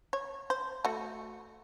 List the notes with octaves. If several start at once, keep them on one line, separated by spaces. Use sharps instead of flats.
C#5
C5
A3 F#4